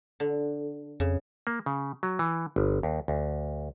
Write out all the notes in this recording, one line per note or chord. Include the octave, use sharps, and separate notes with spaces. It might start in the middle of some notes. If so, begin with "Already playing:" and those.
D3
F2 C#3
A#3
C#3
F#3
E3
G1
D#2
D2